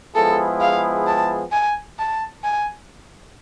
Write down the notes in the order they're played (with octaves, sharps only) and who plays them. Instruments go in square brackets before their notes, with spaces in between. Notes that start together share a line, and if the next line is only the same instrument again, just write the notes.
[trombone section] F3 G#3 B3 E4 G#4 [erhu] A4
[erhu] F5
A5
G#5
A5
G#5